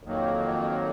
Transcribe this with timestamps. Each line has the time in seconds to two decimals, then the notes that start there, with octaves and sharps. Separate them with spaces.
0.03 F2 D#3 F#3 A#3